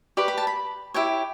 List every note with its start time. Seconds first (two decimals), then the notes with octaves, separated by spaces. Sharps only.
0.17 G4 B4 D5 C#6
0.28 B5
0.38 A5
0.47 B5
0.94 E4 G4 C#5 G5